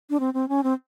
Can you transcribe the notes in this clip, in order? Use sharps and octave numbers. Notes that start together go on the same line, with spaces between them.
D4
C4
C4
C#4
C4